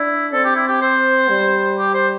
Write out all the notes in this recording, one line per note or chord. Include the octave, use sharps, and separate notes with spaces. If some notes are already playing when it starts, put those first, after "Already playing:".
Already playing: D4 E4
C4 A4
G4
E4
G4
C5
G3
G4
C5